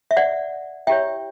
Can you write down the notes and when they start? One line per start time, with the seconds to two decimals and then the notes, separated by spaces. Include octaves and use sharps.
0.11 E5
0.17 D5 F#5
0.87 E4 G4 C#5 E5 G5